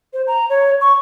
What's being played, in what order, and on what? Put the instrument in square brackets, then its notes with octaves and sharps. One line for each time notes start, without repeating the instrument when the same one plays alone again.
[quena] C5
A#5
C#5
C#6